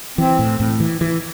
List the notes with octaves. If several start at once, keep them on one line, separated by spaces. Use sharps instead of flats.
E3 C4
A2
A2
E3
E3